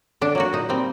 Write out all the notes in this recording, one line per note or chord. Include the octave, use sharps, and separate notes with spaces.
D3 D4
F#3 A#3 F#4
A#2 D#4
G3 A#3 C4